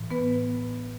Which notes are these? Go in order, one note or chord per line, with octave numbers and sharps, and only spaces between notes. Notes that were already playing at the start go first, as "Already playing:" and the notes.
Already playing: A2 E3
B3 B4